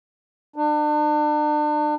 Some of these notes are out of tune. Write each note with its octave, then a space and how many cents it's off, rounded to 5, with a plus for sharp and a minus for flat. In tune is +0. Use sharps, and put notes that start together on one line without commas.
D4 +35